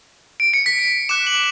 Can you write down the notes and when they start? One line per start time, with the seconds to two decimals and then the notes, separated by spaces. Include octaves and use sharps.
0.40 D7
0.54 C#7
0.66 B6
0.79 C#7
1.09 D6 F#6 E7
1.27 F#7